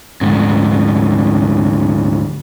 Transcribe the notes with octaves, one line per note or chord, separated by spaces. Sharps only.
D2 G#2